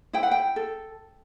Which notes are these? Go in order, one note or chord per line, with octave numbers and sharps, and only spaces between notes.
E4 G5
F#5
G5
A4